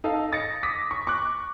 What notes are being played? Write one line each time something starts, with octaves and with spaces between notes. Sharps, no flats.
D#4 A4 D#5 F5
D#6 A6 A#6 C#7
D6 D#6 A#6 B6
C#6
C#6 D6 F#6